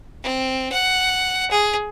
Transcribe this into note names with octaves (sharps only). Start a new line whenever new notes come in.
C4
F#5
G#4